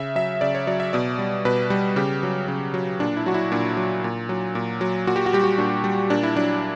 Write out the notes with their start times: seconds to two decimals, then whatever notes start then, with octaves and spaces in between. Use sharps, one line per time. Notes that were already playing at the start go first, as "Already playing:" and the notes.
Already playing: C#3 E5
0.15 F#3 E5
0.41 C#3 D5
0.55 C#5
0.67 F#3 D5
0.80 E5
0.93 B2 D5
1.19 G3
1.45 B2 B4
1.70 G3
1.96 C#3 G4
2.23 F#3
2.48 C#3
2.74 F#3
3.00 A#2 D4
3.17 E4
3.26 F#3 F#4
3.34 E4
3.52 A#2 D4
3.77 F#3
4.04 A#2
4.29 F#3
4.55 A#2
4.81 F#3
5.07 A#2 F#4
5.16 G4
5.26 F#4
5.33 G3 G4
5.44 F#4
5.58 A#2 D4
5.84 G3
6.10 A#2 D4
6.23 E4
6.36 F#3 D4